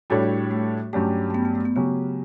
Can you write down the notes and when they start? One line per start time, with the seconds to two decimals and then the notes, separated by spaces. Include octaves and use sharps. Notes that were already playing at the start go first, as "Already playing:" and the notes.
0.10 A2 G3 D4 F#4 A4 C#5
0.51 A3
0.93 G2 F#3 A3 C#4 G4
1.30 A3
1.34 B3
1.45 B3
1.55 A3
1.65 B3
1.76 C#3 F#3 B3 C#4 G4